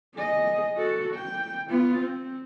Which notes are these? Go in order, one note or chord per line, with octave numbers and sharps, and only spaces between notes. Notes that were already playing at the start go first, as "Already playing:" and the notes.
G#4 D#5
F#4 A4
G5
B3 F4
C4